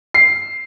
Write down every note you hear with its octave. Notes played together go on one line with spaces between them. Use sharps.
C7